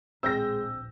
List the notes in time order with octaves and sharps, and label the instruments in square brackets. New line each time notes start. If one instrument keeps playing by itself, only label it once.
[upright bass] D1 A#1 [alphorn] G#3 [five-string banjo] C4 [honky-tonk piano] E6 G6 A#6